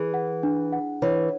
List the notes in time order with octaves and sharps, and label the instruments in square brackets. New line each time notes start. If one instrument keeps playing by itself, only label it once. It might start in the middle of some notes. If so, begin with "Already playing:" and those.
Already playing: [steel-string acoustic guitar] E3 [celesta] G#4
[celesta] F#5
D4
F#5
[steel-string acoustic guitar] E3 [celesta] C#5